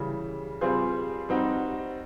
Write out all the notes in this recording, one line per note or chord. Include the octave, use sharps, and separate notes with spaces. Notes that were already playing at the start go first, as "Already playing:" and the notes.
Already playing: C#3 E3 G3
G3 C4 F4 G#4 C5
G3 C4 D#4 F#4